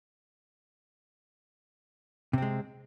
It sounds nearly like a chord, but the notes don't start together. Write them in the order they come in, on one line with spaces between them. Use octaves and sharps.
C3 C4 G#3